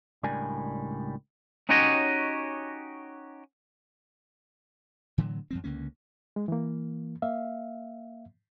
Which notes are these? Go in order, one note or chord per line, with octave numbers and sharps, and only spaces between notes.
C#2 A2 G3 D4 A#4 G#5
C#4 D#4 F#4 G4 C#5 D#5
A2 D3 E3 F#3
F#2 F3 C4
C#2 D3 A#3 C#4
G#3
E3 A#3
A#3 E5 F5